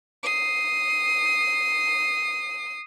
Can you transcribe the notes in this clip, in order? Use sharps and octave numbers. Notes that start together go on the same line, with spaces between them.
D#6 C7